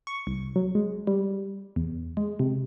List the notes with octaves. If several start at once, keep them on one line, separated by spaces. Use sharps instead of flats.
C#6
C2
F#3
G#3
G3
E2
G#3
C3